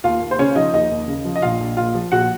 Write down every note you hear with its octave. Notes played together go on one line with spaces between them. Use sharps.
D#2 F4 F5
D#2
C5
C#3 C#4 C#5
F3 D#4 D#5
D#2 D#4 D#5
D#2
C#3
F3
D#5
A#1 F4 F5
A#1
A#2 F4 F5
F3
A#1 F#4 F#5